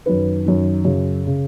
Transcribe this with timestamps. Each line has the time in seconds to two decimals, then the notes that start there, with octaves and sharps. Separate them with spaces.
0.06 F#2 D#3 B4
0.45 F#2 D#3
0.85 F#2 C#3
1.26 C#3